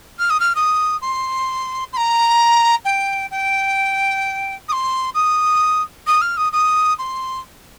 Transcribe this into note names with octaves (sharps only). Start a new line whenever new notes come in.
F6
D#6
F6
D#6
C6
C6
A#5
G5
G5
D#6
C6
D#6
D#6
F6
D#6
D#6
C6